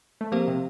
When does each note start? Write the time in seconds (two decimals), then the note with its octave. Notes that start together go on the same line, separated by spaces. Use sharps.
0.21 A3
0.32 F3 A#3 C4 G4 C5 F5
0.48 C3